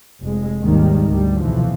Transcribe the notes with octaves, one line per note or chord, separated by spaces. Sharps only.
F1 G#3
G#1 D#2 D#3 G3 G#3
D2 G3
B1 C3 E3 F3